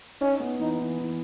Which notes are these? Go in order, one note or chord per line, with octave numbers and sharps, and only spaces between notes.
C#4 D#4
B3
E3 D#4
E3
E3